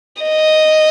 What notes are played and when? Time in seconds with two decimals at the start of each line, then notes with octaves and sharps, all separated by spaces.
0.22 D#5